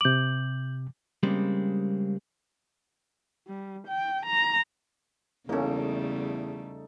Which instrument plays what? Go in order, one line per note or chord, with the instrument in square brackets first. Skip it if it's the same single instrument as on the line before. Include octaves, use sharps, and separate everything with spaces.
[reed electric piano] C3 D6 [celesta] G6 F#7
[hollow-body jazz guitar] C#3 G3 G#3 A#3 C4
[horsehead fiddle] G3
G5
A#5
[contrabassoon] E2 [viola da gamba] C#3 G3 A3 [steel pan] A#3 C#4 [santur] D#4 A4